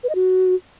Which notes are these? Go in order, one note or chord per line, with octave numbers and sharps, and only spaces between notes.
B4
D#5
F#4